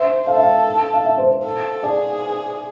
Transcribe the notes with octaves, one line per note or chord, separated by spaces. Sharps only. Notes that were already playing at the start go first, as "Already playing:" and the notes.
Already playing: C5 E5
A4 F5
E5
F5
F5
E5
C5
C5
A4
G#4 D5